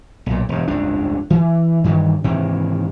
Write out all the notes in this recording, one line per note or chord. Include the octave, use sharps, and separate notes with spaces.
B1 A#2
E1 G2
F1 C#2 G2 D4
E3
G2 D#3 E3
G#2 C3 D#3 E3